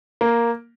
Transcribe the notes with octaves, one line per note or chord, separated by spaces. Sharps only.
A#3